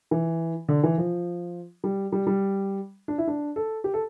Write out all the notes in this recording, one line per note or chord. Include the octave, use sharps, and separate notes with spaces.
E3
D3
E3
F3
G3
G3
G3
D4
E4
D4
A4
G4
A4